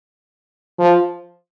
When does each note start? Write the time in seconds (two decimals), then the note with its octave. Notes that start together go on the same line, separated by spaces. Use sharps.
0.79 F3